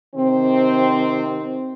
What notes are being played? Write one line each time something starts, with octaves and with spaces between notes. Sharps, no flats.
C3 D#3 C4